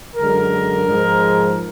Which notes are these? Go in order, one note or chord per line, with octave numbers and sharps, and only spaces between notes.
F#2 D3 G#3 A#4
G#2 F3 G#3